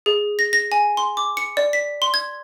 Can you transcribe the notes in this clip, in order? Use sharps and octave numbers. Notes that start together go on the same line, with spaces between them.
G#4
A#6
A#6
G#5
C6
D6
C#7
D5
B6
C6
G#6